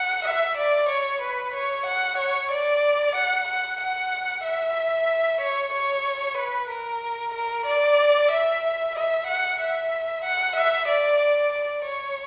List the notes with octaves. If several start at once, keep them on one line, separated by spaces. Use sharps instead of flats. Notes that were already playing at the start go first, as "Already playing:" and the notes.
Already playing: F#5
E5
D5
C#5
B4
C#5
F#5
C#5
D5
F#5
F#5
F#5
E5
C#5
C#5
B4
A#4
A#4
D5
E5
E5
F#5
E5
F#5
E5
D5
D5
C#5